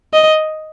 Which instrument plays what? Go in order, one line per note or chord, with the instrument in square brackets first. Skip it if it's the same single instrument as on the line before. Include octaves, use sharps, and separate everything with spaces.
[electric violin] D#5